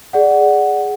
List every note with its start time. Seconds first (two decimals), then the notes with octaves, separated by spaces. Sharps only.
0.13 G#4 D5 F#5